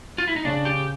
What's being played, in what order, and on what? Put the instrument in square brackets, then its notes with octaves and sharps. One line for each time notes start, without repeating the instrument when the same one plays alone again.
[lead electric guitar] F4
E4
D#4
[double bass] C#3 [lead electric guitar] D4
[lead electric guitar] G4